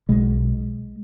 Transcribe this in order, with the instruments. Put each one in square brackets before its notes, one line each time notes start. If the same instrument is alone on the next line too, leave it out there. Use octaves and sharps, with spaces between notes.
[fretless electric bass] B1 B2 G#3